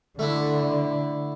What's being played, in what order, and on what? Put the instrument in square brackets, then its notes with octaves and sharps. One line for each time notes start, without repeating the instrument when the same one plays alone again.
[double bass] D3 [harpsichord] A3 D4 E4